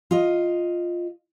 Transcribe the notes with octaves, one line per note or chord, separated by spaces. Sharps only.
F4 D#5